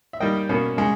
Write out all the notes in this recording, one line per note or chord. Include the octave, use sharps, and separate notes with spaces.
E5
D#3 G3 A#3 D#5 G5
B2 A#3 C#4
C#3 G#3 C#4